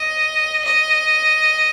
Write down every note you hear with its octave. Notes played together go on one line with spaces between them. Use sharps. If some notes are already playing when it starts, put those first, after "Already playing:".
Already playing: D#5
D#5